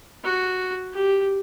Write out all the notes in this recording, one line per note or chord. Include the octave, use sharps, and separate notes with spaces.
F#4
G4